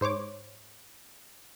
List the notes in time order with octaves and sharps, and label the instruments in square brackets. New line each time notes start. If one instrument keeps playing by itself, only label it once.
[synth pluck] G#2 C5 C#5 D6